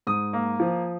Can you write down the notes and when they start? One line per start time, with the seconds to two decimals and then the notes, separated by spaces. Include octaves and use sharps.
0.07 G#2 D#6
0.33 A#3
0.60 F3